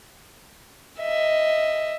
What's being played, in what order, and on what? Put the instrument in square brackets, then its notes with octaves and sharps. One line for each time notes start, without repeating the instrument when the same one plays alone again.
[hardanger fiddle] D#5 E5